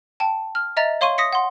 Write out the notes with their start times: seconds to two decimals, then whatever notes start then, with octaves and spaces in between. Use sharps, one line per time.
0.20 G5 A5
0.55 F6
0.77 D#5 E5 A#5 A6
1.01 C#5 F5 C6 C#6 D#7
1.18 D#6 A#6 B6 C#7
1.33 F#5 C6